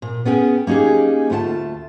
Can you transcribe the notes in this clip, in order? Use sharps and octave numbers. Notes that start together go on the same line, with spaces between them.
A#2
B3 C#4 G#4 G5
A#3 C#4 D#4 G4 G#4
D2 A3 F4 F#5 A5